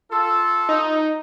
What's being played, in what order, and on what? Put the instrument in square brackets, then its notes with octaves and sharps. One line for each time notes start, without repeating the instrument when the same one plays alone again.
[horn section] F4 A4
[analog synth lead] D#4